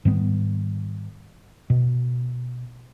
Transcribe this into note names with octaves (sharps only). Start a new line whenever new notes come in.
G#2 D#3 G3 B3
B2